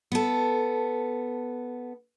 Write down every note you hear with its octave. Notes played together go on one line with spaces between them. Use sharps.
B3 A4